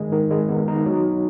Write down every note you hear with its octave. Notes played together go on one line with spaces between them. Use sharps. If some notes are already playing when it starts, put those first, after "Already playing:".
Already playing: D#3 G#3
D#3
G#3
B3
D#4
F#3